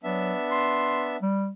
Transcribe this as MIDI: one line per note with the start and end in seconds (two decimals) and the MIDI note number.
0.04 0.33 54
0.04 1.16 59
0.04 1.16 62
0.04 1.16 76
0.51 1.04 84
1.22 1.50 55